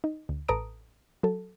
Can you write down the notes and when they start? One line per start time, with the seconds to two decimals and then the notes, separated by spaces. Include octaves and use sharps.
0.04 D#4
0.29 D2
0.48 A1 A4 B4 A#5 D#6 D7
1.23 F#3 A4